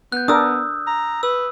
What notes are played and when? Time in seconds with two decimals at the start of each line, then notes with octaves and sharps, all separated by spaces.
0.12 B3 F#6 G6
0.28 D4 A#4 D#6 E6
0.87 A#5
1.23 B4 E6